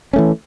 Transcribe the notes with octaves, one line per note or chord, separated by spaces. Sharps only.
E3 A3 C#4